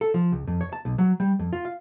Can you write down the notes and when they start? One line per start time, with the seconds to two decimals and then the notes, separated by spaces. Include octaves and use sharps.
0.01 A4
0.14 F3
0.32 C#2
0.47 F2
0.61 C#5
0.73 A5
0.85 B1
0.98 F#3
1.20 G3
1.39 F2
1.53 F4
1.65 F5